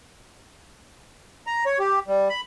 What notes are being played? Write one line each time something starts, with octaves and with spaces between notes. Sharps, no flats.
A#5
C#5
G4
G3
B5